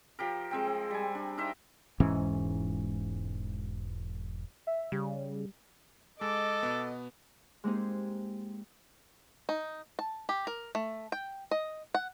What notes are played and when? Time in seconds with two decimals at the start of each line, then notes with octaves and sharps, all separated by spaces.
0.19 F3 G4 A#4
0.51 G#3 C4 G5
0.67 C4
0.91 G3 G#5
1.15 D4
1.38 D#4 A#4 C5 E5
2.00 E1 G#2 E3 C#4
4.67 E5
4.92 C#3 G3
6.21 G#3 A4 D#5 D6
6.63 B2 B3
7.64 G#3 A#3 C4 D#4 G4 G#4
9.49 D#4
9.99 A5
10.29 G4
10.47 A#4
10.75 A3
11.12 G5
11.51 D#5
11.94 F#5